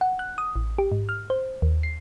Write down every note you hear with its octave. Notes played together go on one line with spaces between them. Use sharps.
F#5
F#6
D#6
A1
G4
G#2
F6
C5
D#2
C7